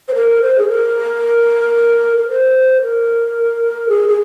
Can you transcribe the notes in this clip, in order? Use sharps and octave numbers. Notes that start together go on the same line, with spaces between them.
C5
A#4
C5
G#4
A#4
A#4
C5
A#4
G#4
G#4